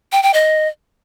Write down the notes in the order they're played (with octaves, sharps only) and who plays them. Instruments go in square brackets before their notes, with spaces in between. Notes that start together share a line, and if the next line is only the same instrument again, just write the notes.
[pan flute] G5
G5
D#5